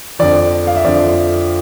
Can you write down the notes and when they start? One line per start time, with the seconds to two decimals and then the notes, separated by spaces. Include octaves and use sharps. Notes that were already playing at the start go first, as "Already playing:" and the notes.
0.19 F2 D3 F3 D5
0.67 F5
0.76 E5
0.84 F2 D3 F3 D5